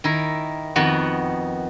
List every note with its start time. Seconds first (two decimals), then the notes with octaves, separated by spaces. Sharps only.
0.04 D#3 E4 A#4
0.76 F2 D#3 B3 F#4 F#5